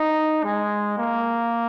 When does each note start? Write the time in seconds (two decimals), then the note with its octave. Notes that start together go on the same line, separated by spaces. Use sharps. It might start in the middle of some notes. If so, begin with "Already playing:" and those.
Already playing: D#4
0.44 G#3
0.98 A#3